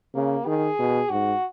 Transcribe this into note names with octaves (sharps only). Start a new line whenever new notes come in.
C#3 A#3
D#3 G#4
B2
G#2 F#4